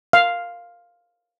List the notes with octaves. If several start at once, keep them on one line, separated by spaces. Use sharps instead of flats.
F5